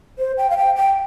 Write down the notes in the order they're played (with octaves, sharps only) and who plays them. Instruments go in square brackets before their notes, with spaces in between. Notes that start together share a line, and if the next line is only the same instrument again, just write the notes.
[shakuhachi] C5
G5
F5
G5
G5